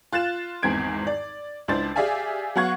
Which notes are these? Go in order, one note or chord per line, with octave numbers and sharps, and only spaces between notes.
F4 F#6 A6 E7
G#1 E2 G#2 C4 G#6 D7
D5
C#2 D4 E4 C5 A6
G4 G#4 D5 E5 F5 G#5
F#3 B3 F5 F#5 C#6 G#6